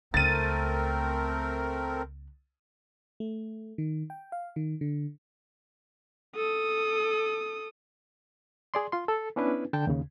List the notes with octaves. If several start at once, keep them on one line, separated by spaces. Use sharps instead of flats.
C#2 A3 B3 C4 A#4 A6 D#7
A3
D#3
G5
F5
D#3
D3
A4 D#6
G#4 D5 C6
F4 C6
A4
B3 C#4 D4 E4 B4
D3 G5 A5 G6
D#2 C#3